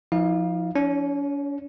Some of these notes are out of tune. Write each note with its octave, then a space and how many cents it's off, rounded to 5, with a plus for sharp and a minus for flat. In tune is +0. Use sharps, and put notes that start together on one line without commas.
F3 +0 D#4 +45 F5 +0
C#4 +45 C#5 +0